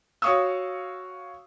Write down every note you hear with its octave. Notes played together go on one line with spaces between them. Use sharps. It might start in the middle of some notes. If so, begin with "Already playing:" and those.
F#4 C#5 F5 C#6 D#6 E6